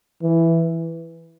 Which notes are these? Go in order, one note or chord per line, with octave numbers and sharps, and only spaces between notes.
E3